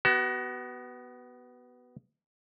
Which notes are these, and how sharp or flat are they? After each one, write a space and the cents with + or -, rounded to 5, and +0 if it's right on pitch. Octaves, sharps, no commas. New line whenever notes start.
B3 +0 F#4 +35